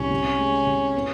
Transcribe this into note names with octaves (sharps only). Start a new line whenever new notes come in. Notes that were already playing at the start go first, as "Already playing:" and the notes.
Already playing: C2 C#4
C3
G#3
C3
B3